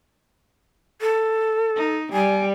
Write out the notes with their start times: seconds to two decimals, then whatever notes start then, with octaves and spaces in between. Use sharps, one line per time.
1.01 A4
1.76 D#4
2.12 G3 G#5